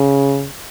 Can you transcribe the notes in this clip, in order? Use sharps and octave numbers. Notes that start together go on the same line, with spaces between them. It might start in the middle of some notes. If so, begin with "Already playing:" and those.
Already playing: C#3